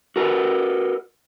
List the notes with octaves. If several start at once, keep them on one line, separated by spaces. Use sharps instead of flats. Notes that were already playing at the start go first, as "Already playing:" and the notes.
F#4 A#4 B4